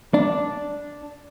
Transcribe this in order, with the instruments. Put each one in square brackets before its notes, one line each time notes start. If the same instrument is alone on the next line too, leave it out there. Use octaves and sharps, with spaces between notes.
[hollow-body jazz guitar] D4